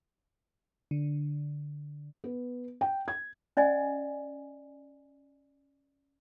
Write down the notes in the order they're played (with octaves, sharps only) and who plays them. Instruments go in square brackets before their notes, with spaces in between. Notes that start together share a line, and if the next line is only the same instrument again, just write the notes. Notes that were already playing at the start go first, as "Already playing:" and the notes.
[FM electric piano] D3
[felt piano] B3
G5
G#6
[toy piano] C#4 D5 D#5 G#5